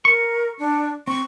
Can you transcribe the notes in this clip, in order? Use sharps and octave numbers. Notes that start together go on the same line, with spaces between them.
A#4 C#6
D4
C4 C#6